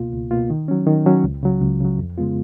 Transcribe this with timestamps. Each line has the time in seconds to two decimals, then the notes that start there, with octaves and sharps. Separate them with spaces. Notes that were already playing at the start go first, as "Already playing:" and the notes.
Already playing: C#2 B2 A#3 F4
0.13 C#2
0.31 B2 A#3 F4
0.50 D#3
0.68 F#3 C#4
0.87 D#3
1.06 F#3 C#4
1.23 C#2
1.43 C#3 F#3
1.62 C#2
1.81 C#3 F#3
1.99 F2
2.17 C#3 G#3 B3 F4